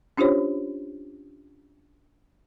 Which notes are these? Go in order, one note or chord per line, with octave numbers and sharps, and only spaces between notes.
C#4 D4 F4 G4 C5 C#5